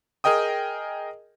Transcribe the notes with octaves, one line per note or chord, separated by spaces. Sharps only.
G#4 A#4 D#5 G5 D#6